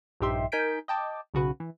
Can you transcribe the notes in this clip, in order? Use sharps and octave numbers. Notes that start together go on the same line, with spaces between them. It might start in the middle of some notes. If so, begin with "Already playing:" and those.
A#1 G2 D#4 G4 E5 C6
D#4 A#4 G#5 G6 B6 D7
D#5 G5 A5 D6
B1 C#3 F#4 B4
E3